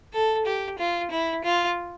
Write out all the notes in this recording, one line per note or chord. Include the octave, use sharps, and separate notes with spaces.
A4
G4
F4
E4
F4